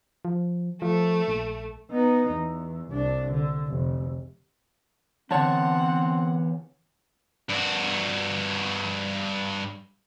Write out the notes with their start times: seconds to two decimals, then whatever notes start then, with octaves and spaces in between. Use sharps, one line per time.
0.25 F3
0.82 F3 A3
1.28 A#1
1.92 B3 D#4
2.32 E2
2.89 C2 D4
3.32 D3
3.68 F1
5.31 E2 D3 C4 C#5 F#5 A5
7.50 G2 F#4